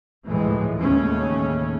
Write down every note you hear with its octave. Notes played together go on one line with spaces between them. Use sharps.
D2 A2 E3 F3 G#3
D#2 A2 C#3 A3 C#4